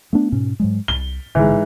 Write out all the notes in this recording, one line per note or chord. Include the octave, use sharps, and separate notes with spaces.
A3 B3 D4
G#2 B2 C#4
G#2 F#3 G#3
C2 G7
A1 G#2 D3 E3